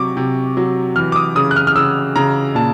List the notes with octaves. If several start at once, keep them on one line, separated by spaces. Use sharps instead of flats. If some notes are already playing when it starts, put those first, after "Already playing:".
Already playing: C3 F#3 C#6 D6
C3
F#3
E3 F6
D6
D#6
C#3 D#6
F#6
F6
F6
C#3 E6
C#3 A#5
A#2 A5